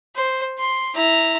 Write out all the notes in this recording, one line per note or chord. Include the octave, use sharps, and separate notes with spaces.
C5
C6
E4 A#5